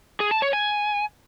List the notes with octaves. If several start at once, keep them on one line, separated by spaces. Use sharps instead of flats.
G#4
A5
C#5
G#5